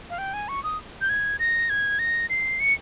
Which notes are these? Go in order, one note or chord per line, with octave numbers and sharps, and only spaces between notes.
F5
G5
G#5
C#6
D#6
G6
G#6
A#6
G#6
A#6
C7
C#7